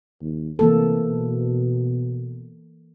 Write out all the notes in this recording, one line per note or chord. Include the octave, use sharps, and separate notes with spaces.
D#2
C3 E3 A#3 A4
B2